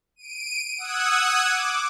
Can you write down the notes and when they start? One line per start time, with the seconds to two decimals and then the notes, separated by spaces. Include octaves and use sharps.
0.16 D7 D#7
0.78 F#5 D#6 E6 F#6 G#6
1.44 D6